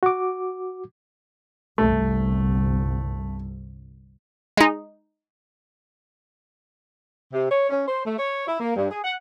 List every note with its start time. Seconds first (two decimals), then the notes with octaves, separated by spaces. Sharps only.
0.03 F#4 D6
1.78 G1 C2 A3
4.57 G#3 D#4
7.33 C3
7.50 C#5
7.70 C#4
7.87 C5
8.06 A3
8.18 C#5
8.46 E4
8.59 A#3
8.76 G2
8.91 G#4
9.04 F#5